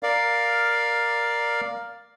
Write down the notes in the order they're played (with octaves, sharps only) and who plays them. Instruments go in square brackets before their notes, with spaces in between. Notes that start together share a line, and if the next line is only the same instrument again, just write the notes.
[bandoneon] A#4 D5 F5